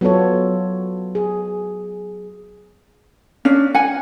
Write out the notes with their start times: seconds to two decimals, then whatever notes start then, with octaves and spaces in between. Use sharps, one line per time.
0.01 F#3 B3 F4 A4 C#5
1.15 G#4
3.45 C#4 D4
3.75 F#5 G#5